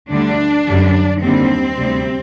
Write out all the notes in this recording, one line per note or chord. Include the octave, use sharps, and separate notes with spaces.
D2 D3 G3 D4
F#2 D3 G3
D#2 D3 G3 C4
D2 C3 G3